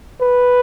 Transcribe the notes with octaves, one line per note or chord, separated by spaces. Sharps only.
B4